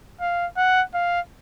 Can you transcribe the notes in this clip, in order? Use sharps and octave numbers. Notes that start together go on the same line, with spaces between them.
F5
F#5
F5